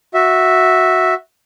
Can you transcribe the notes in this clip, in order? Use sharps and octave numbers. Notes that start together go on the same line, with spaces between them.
F#4 E5